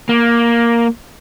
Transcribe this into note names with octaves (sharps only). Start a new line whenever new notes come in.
A#3